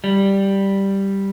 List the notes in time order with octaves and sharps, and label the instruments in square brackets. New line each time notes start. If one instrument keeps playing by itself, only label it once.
[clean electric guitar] G3